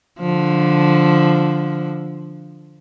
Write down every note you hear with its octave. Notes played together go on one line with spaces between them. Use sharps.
D3 F3